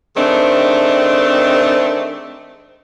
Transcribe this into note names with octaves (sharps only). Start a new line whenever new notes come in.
D#3 G#3 A3 C4 D4